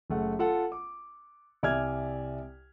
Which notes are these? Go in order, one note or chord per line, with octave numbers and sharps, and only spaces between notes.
F#1 A3 F#5
F4 A4 F#5
D6
C2 D5 E5 G#5 F6 G#6